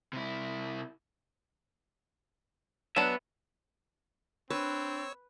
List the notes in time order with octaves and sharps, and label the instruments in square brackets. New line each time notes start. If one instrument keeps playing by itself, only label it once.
[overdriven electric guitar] C3 E4
[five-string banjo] F#3 D4 [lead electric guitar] B3 E5
[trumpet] C4 [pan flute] D4 [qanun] B4 [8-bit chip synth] C#5 E6